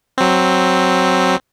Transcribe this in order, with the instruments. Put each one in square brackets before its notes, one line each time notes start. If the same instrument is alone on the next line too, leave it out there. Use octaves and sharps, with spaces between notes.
[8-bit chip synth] F#3 C4